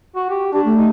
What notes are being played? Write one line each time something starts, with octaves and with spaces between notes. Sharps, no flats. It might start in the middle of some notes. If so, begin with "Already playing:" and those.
F#4
G4
D4 G4
A3
D#4